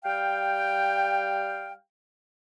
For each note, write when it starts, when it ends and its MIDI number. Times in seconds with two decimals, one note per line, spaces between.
0.04 1.73 55
0.04 1.73 77
0.04 1.73 79